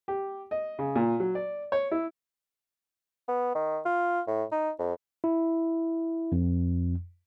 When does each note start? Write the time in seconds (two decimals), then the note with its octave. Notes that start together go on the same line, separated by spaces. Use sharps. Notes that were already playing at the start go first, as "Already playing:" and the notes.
0.08 G4
0.51 D#5
0.79 C#3
0.96 A#2
1.20 F#3
1.35 D5
1.72 C#5
1.91 E4
3.28 B3
3.55 D#3
3.85 F4
4.27 A2
4.52 D#4
4.79 F2
5.24 E4
6.32 F2